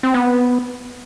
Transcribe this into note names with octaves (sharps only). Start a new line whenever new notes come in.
C4
B3